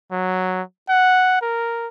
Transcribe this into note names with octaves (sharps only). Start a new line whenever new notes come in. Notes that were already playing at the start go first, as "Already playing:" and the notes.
F#3
F#5
A#4